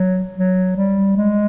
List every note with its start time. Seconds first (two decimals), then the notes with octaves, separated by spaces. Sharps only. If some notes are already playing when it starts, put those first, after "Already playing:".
Already playing: F#3
0.36 F#3
0.76 G3
1.16 G#3